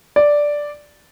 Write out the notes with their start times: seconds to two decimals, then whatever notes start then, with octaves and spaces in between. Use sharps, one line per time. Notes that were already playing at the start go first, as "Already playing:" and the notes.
0.16 D5